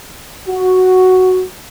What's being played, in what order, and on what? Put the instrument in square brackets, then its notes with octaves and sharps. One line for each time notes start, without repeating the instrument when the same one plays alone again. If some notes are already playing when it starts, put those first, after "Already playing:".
[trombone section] F#4